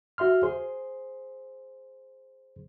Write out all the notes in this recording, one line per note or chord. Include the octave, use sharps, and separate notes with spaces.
F#4 E5 C6 F6
G#4 C5 C6